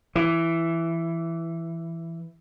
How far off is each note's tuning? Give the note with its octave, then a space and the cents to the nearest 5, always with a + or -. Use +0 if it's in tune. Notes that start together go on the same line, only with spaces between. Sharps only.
E3 +10